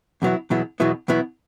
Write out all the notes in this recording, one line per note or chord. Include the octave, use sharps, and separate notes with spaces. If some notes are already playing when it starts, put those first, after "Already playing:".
E2 B2 F#3 B3 E4
E2 B2 F#3 B3 E4
E2 B2 F#3 B3 E4
E2 B2 F#3 B3 E4